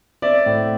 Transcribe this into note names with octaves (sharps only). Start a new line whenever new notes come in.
C4 D5 E5
A2